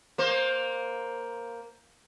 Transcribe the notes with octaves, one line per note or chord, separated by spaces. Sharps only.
A#3 C5